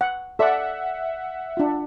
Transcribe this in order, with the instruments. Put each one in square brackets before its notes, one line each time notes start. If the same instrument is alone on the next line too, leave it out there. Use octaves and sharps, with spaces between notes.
[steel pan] F#5
[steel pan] A4 D5 [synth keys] E5 F#5
[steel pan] D4 F4